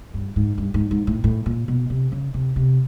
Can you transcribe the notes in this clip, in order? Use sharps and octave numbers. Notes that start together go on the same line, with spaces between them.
G2
G#2
G2
G#2
G#2
A2
A2
A#2
B2
C3
C#3
C3
C3